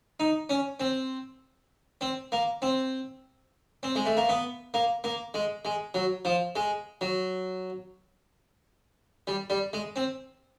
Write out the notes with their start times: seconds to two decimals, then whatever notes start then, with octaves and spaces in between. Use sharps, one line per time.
0.20 D#4
0.49 C#4
0.80 C4
2.01 C4
2.32 A#3
2.62 C4
3.83 C4
3.96 G#3
4.06 A3
4.17 A#3
4.29 B3
4.74 A#3
5.04 A#3
5.34 G#3
5.65 G#3
5.94 F#3
6.25 F3
6.56 G#3
7.01 F#3
9.27 G3
9.50 G3
9.73 G#3
9.96 C4